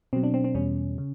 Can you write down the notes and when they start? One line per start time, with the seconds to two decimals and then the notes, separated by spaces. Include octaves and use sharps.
0.13 B2 F#3 C4
0.23 D4
0.34 C4
0.44 C4
0.54 E2 B2 G3 C#4
0.98 C#3